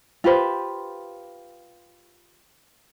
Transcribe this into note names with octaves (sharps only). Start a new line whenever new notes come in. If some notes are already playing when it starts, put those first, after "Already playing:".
F4 G4 B4 C5